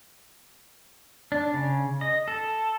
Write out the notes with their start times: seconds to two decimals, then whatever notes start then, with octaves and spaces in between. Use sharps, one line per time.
1.32 D4
1.54 C#3
2.01 D#5
2.28 A4